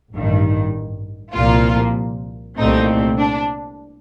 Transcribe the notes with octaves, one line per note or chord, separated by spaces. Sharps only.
A1 G2 D#3
C2 A#2 F3 A#3 F4
C2 A#2 A3 C4 D#4
D4